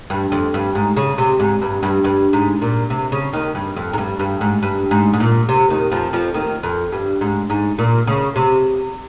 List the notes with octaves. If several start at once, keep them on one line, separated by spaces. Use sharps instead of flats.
G2
F2
G2
G#2
C#3
C3
G#2
G2
G2
G2
G#2
A#2
C3
C#3
D#2 D#3
G2
F2
G#2
G2
G2
G#2
G2
G#2
G#2
A#2
C3
D#2 D#3
F2 F3
F2 F3
D#2 D#3
F2
G2
G#2
G#2
A#2
C#3
C3